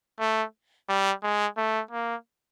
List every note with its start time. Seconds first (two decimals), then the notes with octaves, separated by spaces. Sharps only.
0.20 A3
0.89 G3
1.23 G#3
1.57 A3
1.91 A#3